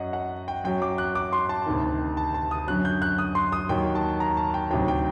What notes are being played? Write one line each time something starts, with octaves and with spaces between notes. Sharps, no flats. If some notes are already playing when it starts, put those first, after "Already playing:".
Already playing: F#2 F#3 D#5 F#5
F#5
G5
F#2 F#3 G5
D6
F#6
D6
C6
A5
D2 C3 D#3
A5
A5
D#6
F#2 D3 F#3 F#6
G6
F#6
D#6
C6
D#6
D#2 D#3 F#3 G5
A5
A#5
A5
G5
D2 C3 D#3 F#3 G5
G5